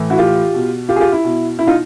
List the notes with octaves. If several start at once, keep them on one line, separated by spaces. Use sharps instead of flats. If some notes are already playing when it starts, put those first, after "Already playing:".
Already playing: A2 E3
E4 F#4
F4 G4
B2
F4 G4
G#4
F4 G4
E4
B2
E4
D#4 F4